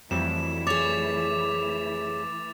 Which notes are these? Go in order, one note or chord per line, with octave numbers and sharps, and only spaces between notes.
F2 E3 F#3 G3 A3 E4 E7
G#4 C#5 D6 A6 F7